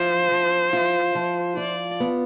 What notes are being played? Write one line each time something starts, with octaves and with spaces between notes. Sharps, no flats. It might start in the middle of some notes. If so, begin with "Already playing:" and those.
Already playing: F3 F4 C5
F3
F4
F3
F4 D5
B3